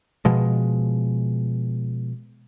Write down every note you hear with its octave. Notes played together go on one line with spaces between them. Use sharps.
B2 F3 G#3